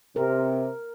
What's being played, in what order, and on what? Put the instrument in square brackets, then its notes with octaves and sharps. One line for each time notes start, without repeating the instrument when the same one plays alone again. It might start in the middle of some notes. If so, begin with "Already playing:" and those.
[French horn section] C3 [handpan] A#4